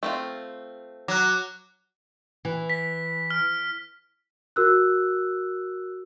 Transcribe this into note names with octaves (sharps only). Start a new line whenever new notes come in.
A3 C4 F4
F#3 D6 F#6
E3
B6
F6
F#4 A#4 E6 F#6